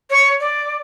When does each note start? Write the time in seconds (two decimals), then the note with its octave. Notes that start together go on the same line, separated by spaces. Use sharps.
0.10 C#5
0.40 D5